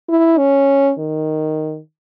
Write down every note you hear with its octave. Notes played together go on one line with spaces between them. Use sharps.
E4
C#4
D#3